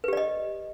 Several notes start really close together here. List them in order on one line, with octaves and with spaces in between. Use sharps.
B4 G4 D5 D#5